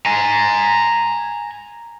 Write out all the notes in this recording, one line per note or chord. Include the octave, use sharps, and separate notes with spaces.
G#5 A#5